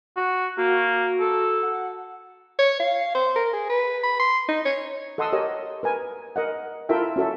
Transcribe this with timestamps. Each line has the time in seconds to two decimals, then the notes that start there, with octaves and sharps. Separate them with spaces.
0.16 F#4
0.57 A#3 F#4
1.20 A4
1.63 F#5
2.59 C#5
2.80 F5
3.15 C5
3.36 A#4
3.53 G#4
3.70 B4
4.03 B5
4.20 C6
4.49 D#4
4.65 C#5
5.18 A4 D#5 F#5 C6 D#6 E6
5.33 G4 A#4 C#5 D#5
5.83 A#4 B4 G#5
6.36 A#4 D#5 F#5
6.89 E4 F4 A4 A#4 E5 G5
7.16 C#4 F#4 A4 E5